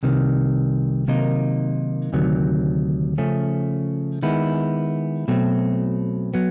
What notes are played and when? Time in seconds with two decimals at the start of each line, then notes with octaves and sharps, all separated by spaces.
0.03 C2 C3 D#3
1.08 C3 D#3 F#3 A#3 D#4
2.13 D2 C3 D#3 F#3
3.18 C#3 F3 A3 C#4
4.23 D#3 G#3 B3 E4
5.28 B2 F#3 A3 C4
6.34 F#3 B3